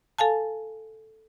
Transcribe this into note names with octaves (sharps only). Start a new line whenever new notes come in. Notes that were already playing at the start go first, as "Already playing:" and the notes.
A4 F5 G#5 A5